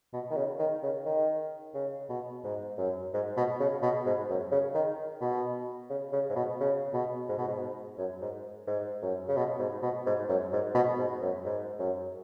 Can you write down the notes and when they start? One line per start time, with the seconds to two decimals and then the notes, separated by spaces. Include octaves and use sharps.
0.13 B2
0.31 D#3
0.36 C#3
0.59 D#3
0.83 C#3
1.06 D#3
1.75 C#3
2.09 B2
2.44 G#2
2.78 F#2
3.14 G#2
3.37 B2
3.60 C#3
3.82 B2
4.06 G#2
4.29 F#2
4.52 C#3
4.74 D#3
5.21 B2
5.90 C#3
6.13 C#3
6.30 G#2
6.36 B2
6.60 C#3
6.94 B2
7.29 G#2
7.38 B2
7.48 G#2
7.98 F#2
8.22 G#2
8.67 G#2
9.02 F#2
9.28 C#3
9.37 B2
9.59 G#2
9.82 B2
10.06 G#2
10.29 F#2
10.52 G#2
10.75 B2
10.99 G#2
11.22 F#2
11.45 G#2
11.79 F#2